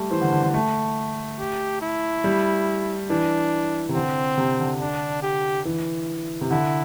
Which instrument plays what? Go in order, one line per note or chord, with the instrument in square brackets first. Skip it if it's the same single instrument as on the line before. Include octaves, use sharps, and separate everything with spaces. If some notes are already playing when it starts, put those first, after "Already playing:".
Already playing: [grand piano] G3 A3
[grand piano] E3 [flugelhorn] C5
[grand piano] D3
D3
D3
A3
[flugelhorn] G4
E4
[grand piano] G3
[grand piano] E3 [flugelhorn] D4
[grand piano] C3
[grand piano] D3 [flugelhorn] C4
[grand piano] C3
D3
[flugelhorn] D4
G4
[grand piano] E3
C3
[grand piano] D3 [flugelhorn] E4